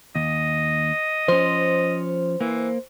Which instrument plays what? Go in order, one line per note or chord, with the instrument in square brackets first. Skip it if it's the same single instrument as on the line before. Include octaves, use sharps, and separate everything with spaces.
[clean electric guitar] D#2 [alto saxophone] D#5
[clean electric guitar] F3 C#4 [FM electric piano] C5
[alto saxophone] E3 [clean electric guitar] A#3